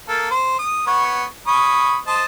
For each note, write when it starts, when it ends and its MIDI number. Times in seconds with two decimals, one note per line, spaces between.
0.09 0.31 58
0.09 0.31 69
0.31 0.55 72
0.59 0.87 87
0.87 1.23 59
0.87 1.23 73
1.47 1.97 73
1.47 1.97 83
1.47 1.97 87
2.07 2.24 72
2.07 2.24 75
2.07 2.24 81